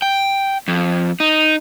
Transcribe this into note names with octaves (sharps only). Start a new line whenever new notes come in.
G5
F2
D#4